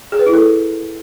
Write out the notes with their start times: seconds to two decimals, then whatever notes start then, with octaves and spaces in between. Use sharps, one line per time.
0.12 G#4
0.19 B4
0.26 E4
0.34 A4